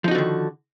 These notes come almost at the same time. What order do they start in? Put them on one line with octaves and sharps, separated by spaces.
F3 D#4 F#4 D3 D#3